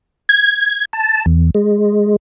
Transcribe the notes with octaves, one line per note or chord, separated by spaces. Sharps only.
G#6
A5
E2
G#3